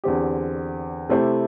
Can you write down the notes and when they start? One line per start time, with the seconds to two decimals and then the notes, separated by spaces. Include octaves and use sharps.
0.04 E2 D3 C4 G4
1.09 C3 A3 E4 G4 C5